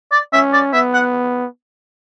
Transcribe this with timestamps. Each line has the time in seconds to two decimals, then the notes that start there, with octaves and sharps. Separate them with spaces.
0.12 D5
0.33 C#4 E5
0.53 D5
0.73 B3 E5
0.94 F#5